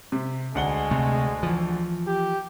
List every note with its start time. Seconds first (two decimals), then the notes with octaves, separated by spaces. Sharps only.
0.12 C3
0.55 D2 G#3 F#5 G7
0.91 C3 A3
1.43 E3 F3
2.07 G4